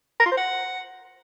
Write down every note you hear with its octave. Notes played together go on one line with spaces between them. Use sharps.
A#4
F4
C5
F#5